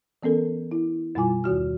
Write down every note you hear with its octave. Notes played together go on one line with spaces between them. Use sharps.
E3 B3 C#4 A4 A#4
E4
F#2 B2 G3 F4 G#5 D6
D#2 D#3 F#4 F6